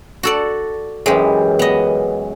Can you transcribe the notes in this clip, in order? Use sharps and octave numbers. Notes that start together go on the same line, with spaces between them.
F#4 A4 D5
F#2 E3 G#3 G4
B3 D#5